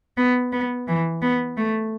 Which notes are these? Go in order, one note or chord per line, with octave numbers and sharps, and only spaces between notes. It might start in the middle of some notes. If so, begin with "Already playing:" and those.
B3
B3
E3
B3
A3